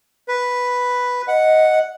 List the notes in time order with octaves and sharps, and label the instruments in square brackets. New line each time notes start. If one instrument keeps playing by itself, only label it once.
[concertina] B4
[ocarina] D#5 [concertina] F#5